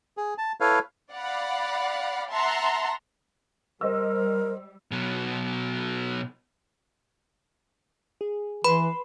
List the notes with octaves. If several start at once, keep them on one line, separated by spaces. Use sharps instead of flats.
G#4
A5
E4 A4 B4 C#5 F5
D5 F5 F#5 B5
E5 F#5 A5 A#5 C6
G3 A#4 C5 D#5 E6
B2 F#3
G#4
E3 B4 B5 C6